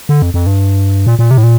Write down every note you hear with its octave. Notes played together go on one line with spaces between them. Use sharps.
D3
F2
F2
G2
A#2
A#2
C3
A2
A#2